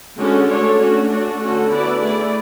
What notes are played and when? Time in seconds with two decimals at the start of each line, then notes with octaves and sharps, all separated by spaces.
0.18 D3 G#3 C#4 F#4 A4
0.49 A3 D4 A4 C#5
0.79 A3 C#4 F#4
1.10 A3 D4 F#4
1.39 D3 A3 C#4 F#4 A4
1.70 B3 E4 B4 D5
2.01 A3 E4 G#4 D5